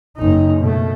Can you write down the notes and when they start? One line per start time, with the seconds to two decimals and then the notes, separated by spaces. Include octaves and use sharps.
0.17 F#1 D#4
0.60 B2 A3